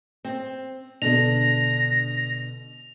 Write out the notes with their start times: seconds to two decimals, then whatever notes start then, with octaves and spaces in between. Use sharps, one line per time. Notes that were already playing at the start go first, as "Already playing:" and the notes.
0.25 C4
1.02 B2 D3 D4 A#6 F7